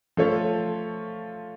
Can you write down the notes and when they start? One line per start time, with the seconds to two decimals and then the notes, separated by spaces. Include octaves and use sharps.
0.17 F3 A3 F4 A4 C#5